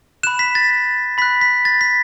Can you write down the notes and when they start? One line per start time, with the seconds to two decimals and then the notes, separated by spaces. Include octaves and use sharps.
0.23 B5 F#6 E7
0.39 B6
0.55 A6
1.18 B5 F#6 B6
1.41 B6
1.65 A6
1.81 B6